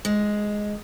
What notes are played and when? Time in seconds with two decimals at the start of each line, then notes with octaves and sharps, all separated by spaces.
0.05 G#3